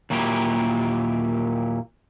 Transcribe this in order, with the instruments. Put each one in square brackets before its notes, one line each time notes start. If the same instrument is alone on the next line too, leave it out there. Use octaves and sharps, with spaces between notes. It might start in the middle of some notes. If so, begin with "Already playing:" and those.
[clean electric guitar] D#2 A#2 F#3 E4 G4